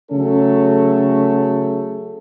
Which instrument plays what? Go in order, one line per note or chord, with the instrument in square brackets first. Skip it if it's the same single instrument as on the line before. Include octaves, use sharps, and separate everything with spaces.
[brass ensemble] C#3 F#3 A3 C#4 A4